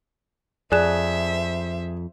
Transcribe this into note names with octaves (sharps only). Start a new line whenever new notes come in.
F2 G#4 C5 D5 E5 F#6 E7